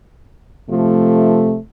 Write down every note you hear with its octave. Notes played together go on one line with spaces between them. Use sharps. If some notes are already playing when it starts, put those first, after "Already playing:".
C3 F3 A3